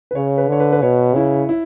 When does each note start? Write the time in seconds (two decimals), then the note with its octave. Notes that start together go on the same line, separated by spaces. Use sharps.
0.11 B4
0.15 C#3 C#5
0.38 B4
0.49 D3 C#5
0.60 B4
0.72 B4
0.82 B2 C#5
1.15 C#3 E4
1.49 E4